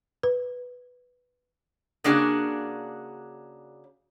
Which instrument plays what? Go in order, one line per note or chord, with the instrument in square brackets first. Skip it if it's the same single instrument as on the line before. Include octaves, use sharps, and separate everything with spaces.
[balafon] B4
[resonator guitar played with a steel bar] C#3 A#3 D4 F#4 G#4